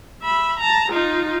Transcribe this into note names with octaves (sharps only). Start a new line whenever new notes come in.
E5 B5
A5 A#5
D#4 F4